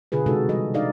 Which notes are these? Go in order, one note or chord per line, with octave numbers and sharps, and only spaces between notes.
B2 D3 F4 G#4 B4
C3 G#3 C4 D#4 F#4 A4
E3 G3 D#5
C3 D4 D#4 D5 D#5 F5